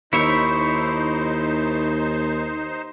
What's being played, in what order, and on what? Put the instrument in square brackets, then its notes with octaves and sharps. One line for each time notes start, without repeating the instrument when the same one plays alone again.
[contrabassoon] D#2 [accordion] D#4 C5 [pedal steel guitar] E4 C#5 E5